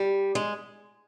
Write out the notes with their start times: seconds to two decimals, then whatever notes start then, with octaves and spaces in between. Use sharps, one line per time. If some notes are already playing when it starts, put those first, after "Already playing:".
Already playing: G3
0.35 G#3